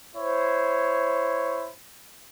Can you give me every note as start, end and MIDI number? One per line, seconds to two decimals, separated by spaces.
0.15 1.69 64
0.15 1.69 72
0.15 1.69 73